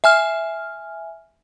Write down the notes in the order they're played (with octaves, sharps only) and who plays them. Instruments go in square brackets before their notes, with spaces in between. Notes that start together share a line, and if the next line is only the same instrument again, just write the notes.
[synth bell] E5 G#5 F6